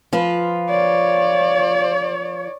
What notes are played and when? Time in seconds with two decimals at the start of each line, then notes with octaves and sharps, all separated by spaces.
0.13 F3 F4 B4
0.69 C#5 D5